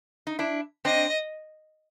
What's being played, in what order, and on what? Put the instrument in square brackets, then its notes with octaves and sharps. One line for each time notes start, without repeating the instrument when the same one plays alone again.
[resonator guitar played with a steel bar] D#4
D4 E4
[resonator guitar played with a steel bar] C4 D4 [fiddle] D#5